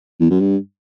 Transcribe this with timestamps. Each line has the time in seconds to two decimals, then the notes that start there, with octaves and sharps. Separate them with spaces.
0.20 E2
0.30 F#2
0.40 G2